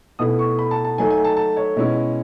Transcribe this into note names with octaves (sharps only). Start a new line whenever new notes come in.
B2 A3 E4 D#6
C#6
B5
A5
A5
D#3 F#3 A3 G#5
G#5
A5
A5
C#5
B2 G#3 C#4 E4